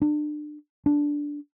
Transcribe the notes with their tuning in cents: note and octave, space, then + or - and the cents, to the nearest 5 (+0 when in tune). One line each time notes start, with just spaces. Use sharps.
D4 +30
D4 -5